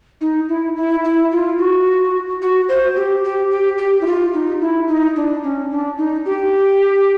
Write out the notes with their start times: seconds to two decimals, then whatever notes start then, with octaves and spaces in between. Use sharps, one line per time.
0.21 D#4
0.49 E4
0.76 E4
1.04 E4
1.32 F4
1.59 F#4
2.42 F#4
2.69 C5
2.96 G4
3.24 G4
3.51 G4
3.78 G4
4.01 E4
4.06 F4
4.34 D#4
4.61 E4
4.88 D#4
5.16 D4
5.43 C#4
5.71 D4
5.98 D#4
6.26 G4